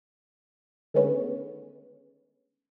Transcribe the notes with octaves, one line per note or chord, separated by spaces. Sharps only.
D3 D#3 G#3 A3 B3 C#4